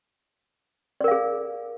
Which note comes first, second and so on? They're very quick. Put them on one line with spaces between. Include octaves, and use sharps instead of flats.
D5 A#4 F5 G#4